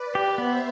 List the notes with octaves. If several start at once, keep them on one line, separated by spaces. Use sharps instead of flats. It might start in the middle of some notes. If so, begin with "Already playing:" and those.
Already playing: B4 D5
G4
B3 C5 E5